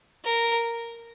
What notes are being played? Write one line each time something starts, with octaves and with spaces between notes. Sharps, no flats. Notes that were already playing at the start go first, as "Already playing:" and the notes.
A#4